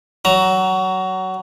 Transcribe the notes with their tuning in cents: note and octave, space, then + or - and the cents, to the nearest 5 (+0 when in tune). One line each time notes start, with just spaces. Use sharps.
F#3 +20 A#5 +0